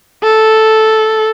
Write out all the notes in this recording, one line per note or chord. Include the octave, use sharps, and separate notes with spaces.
A4